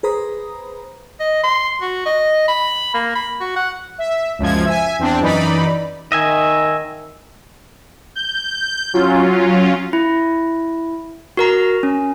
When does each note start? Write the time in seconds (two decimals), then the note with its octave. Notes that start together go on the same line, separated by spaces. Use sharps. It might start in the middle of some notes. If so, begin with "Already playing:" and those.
0.03 G#4 B4 C5 A#5 B5 D#6
1.20 D#5
1.43 C6
1.81 F#4
2.06 D#5
2.48 B5
2.94 A#3
3.15 B5
3.40 F#4
3.56 F#5
3.98 E5
4.39 C#2 F#2 F3 G#6
4.65 E5 G#5
4.99 E2 C4 D4
5.20 F#2 E3 D#4 D5 B5
6.12 D#3 D#5 E5 G#5
8.15 G6
8.94 F#3 C#4 F4
9.93 E4
11.37 F#4 A#4 A#5
11.83 C#4